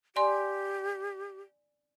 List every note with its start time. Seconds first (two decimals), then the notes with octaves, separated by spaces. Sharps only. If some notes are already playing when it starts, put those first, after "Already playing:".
0.16 G4 D5 G#5 C6